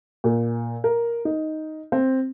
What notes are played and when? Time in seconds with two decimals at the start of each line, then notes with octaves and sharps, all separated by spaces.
0.24 A#2
0.84 A#4
1.25 D#4
1.92 C4